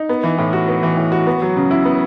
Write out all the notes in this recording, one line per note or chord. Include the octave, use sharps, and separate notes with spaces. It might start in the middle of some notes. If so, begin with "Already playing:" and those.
Already playing: D#4
B3
E3
A2
F#4
B3
E3
A2
F#4
B3
F#3
C#3
E4
B3